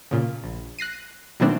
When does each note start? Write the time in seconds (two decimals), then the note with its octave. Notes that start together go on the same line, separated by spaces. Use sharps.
0.11 A#2 C#3
0.44 A#1
0.79 F#6 A#6 C7 D#7
1.40 B2 D#3 F#3 A3 C4 D4